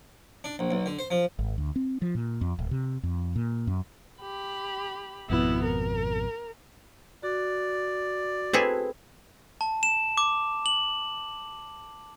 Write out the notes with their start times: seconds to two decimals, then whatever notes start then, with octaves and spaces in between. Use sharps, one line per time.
0.44 D4
0.59 A#1
0.71 B1
0.86 D3
0.99 C5
1.11 F3
1.39 G#1
1.58 D2
1.76 C4
2.02 F3
2.15 A#2
2.41 F2
2.59 D1
2.71 C3
3.03 F2
3.36 A#2
3.67 F#2
4.21 G4 B5
5.30 G#1 F2 B2 B3 E4
5.65 A#4
7.23 F#4 D5
8.53 C4 E4 G#4 A4 B4
9.61 A5
9.83 E7
10.17 D6
10.66 F#7